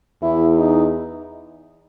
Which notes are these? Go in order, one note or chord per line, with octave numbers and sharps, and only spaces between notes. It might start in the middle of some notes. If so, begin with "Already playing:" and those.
E2 E4
D#4